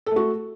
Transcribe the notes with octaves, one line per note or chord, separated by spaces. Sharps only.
A3 F#4 A4